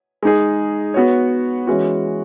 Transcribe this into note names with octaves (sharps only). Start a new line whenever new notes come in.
G#3 D#4 G#4
B3 F#4 C#5
E3 G#3 C#4 F#4